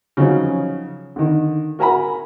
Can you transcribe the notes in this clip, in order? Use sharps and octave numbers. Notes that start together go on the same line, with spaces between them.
C#3 F3 F#3 C#4 D#4
D3 D#3
F#4 A#4 G#5 A#5 B5